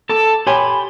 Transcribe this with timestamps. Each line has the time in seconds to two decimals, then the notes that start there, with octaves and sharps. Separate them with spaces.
0.09 A4 A5 D6
0.47 G4 C#5 G#5 B5 C6